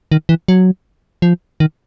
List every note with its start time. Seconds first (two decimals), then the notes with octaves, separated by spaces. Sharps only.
0.12 D#3
0.29 E3
0.48 F#3
1.22 F3
1.60 D#3